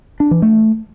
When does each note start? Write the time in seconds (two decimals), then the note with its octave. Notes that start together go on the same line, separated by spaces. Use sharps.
0.20 D4
0.31 E3
0.42 A3